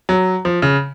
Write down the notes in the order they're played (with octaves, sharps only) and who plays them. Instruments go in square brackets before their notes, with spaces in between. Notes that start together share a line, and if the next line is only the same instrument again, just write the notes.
[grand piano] F#3
F3
C#3